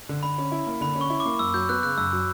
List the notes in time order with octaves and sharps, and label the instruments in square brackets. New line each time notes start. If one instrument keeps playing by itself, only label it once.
[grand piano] D3
[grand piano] D3 [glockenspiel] B5
[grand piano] C#4
E4
A#3
[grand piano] D3 [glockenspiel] B5
[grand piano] C#4
[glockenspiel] C#6
[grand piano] E4
[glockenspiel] D6
[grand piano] A#3
[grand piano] F#2 [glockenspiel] E6
[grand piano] F#3 [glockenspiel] G6
[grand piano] B3 [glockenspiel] F#6
[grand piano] C#3 [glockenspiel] F#6
[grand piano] F#2 [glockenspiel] E6
[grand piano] F#3